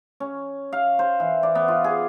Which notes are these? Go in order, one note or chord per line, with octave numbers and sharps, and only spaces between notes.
C#4
F5
C5
E3
D5
B3
F4
G#4